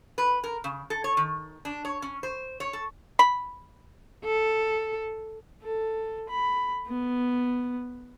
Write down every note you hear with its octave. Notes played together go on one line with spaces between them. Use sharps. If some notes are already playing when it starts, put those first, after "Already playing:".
B4
A#4
C#3
A4
C#5
D#3
D4
C#5
C#4
C5
C#5
A4
B5
A4
A4
B5
B3